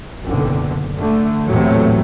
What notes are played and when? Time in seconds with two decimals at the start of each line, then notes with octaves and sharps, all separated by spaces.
0.23 F#1 B1 D3
0.95 D3 A3
1.48 A#1 E2 A2 C3 F#3 A3